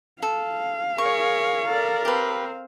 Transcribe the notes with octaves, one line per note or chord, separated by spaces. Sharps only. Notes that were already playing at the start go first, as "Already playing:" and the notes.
A4 F5
G#4 A#4 C#5 C#6
A4 A#4 D5
C4 G4 B4